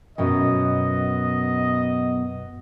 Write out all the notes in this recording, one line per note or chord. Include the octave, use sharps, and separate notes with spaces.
F#2 B2 B3 D#5